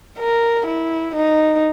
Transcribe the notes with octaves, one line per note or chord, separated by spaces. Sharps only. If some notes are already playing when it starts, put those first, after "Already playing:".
A#4
E4
D#4